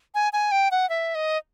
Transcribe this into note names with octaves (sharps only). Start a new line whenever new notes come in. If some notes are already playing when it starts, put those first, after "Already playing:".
G#5
G#5
G5
F#5
E5
D#5